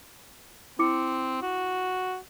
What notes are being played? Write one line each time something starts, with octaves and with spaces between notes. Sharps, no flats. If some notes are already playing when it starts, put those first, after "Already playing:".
C4 E4 D6 C#7
F#4